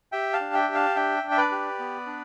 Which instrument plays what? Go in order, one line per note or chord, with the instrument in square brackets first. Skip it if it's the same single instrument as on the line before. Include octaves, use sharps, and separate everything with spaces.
[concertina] G4 E5 G5
F5 A5
D4
E5 G5
G4
F5 A5
D4 E5 G5
D4
E5
B4 D5
G4
B3
D4